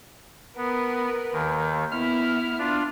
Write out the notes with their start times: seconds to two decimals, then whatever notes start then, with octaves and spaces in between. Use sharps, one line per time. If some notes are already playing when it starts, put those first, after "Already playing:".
0.57 B3 A#4 B4
1.33 D#2 D#3
1.91 B3 E4 F6
2.59 D4 F4